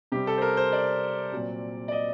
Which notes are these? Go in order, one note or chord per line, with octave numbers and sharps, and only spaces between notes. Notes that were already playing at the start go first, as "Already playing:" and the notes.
C3 G3 C4 G4
A4
C5
A#4
C5
D5
A#2 F#3 C4
D5
D#5